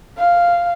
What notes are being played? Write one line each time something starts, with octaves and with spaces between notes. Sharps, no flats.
F5